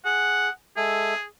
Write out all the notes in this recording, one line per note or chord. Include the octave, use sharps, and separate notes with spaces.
G#4 F#5
G#3 G#4 A4 E5